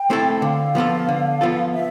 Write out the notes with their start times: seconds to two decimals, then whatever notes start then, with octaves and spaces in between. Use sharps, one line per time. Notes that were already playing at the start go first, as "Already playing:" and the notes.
Already playing: G5
0.10 A3 C4 E4 A4
0.34 G5
0.42 D3 F5
0.75 F3 B3 F4 A4
1.09 D3
1.41 F3 B3 F4 A4
1.74 E5